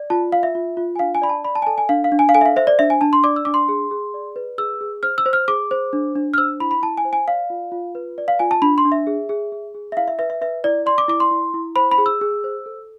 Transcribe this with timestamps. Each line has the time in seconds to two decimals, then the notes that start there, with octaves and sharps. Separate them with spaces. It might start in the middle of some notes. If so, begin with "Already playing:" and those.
Already playing: D5
0.10 F4 A5
0.32 F4 F5
0.43 E5
0.55 F4
0.77 F4
0.96 G#5
0.99 D4 F5
1.15 G#5
1.22 D5 B5
1.29 A5
1.44 D5 B5
1.55 A5
1.62 G#5
1.67 A4 A5
1.78 G#5
1.89 D4 F5
2.04 F5
2.12 D4
2.19 G#5
2.29 F5
2.35 A4 G#5
2.41 E5
2.46 F5
2.56 C5 E5
2.67 D5
2.79 D4 E5
2.90 G#5
3.01 D4 A5
3.13 C6
3.24 D5 D6
3.36 E6
3.45 D4 D6
3.54 C6
3.69 G#4
3.91 G#4
4.14 D5
4.36 B4
4.58 G#4 E6
4.81 G#4
5.03 C5 F6
5.18 E6
5.26 C5
5.33 F6
5.48 G#4 D6
5.71 C5
5.93 D4
6.15 D4
6.34 F6
6.38 C5 E6
6.60 E4 B5
6.71 B5
6.82 E4 A5
6.98 G#5
7.05 C5
7.13 G#5
7.28 D5 F5
7.50 F4
7.72 F4
7.95 B4
8.18 D5
8.28 F5
8.39 F4 G#5
8.51 A5
8.62 D4 B5
8.78 C6
8.85 D4
8.92 E5
9.07 G#4
9.29 G#4
9.52 G#4
9.74 G#4
9.92 E5
9.97 E4 F5
10.08 E5
10.19 B4 E5
10.30 E5
10.41 B4 E5
10.64 E4 D5
10.86 D5 C6
10.98 D6
11.08 E4 D6
11.20 C6
11.31 E4
11.54 E4
11.76 C5 B5
11.91 B5
11.98 G#4
12.06 E6
12.21 G#4
12.44 C5
12.66 A4